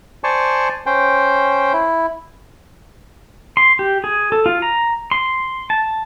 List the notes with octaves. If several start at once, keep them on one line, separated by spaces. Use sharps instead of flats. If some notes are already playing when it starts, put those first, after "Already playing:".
C5 D5 G#5 A5 C#6
C#4 C5 G5
E4
C6
G4
G#4
A4
F4
A#5
C6
A5